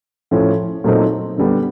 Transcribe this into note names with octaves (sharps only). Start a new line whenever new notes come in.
A2 F3 A3 C#4
A#2 F#3 A3 C4 D#4
D3 G3 B3